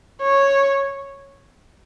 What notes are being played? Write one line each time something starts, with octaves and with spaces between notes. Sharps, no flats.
C#5